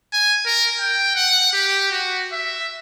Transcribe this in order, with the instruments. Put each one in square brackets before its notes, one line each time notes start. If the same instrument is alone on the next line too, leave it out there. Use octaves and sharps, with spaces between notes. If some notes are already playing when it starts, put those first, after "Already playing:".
[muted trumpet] G#5
A#4
G5
F#5
G4
F#4
E5